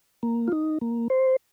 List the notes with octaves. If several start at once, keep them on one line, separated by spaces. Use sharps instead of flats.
A#3
F4
D#4
A#3
C5